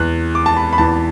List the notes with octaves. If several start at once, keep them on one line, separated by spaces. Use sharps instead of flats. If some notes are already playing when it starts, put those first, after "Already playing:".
Already playing: E2 E3 F#6
D6
A5
B5
B5
E2 E3 A5